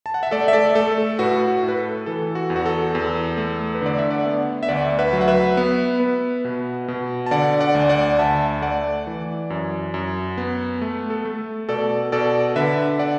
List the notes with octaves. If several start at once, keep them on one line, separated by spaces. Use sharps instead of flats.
A5
F#5
E5
A3 A4 D5
E5
A4 D5
A3 A4
A4
A2 F#4 B4
F#4
A2
B4
A4
E3 A4
F#4
E2
F#4
A4
E2
A3
B4
D3 D5
E5
D5 F#5
B3
E5
D2 D5 F#5
B4 E5
F#3
F#5
B4 E5
B3
B3
B2
B2
A5
D3 D5 F#5
D5 F#5
D2
D5 F#5
D2 E5 A5
A3 D5 F#5
E3
F#2
F#2
B3
A3
A4
A3
B2 A4 D5
B2 A4 D5
D3 B4 E5
D5 F#5